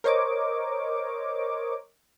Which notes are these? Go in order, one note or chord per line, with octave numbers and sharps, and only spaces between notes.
A#4 C5 C#5 D#5 D6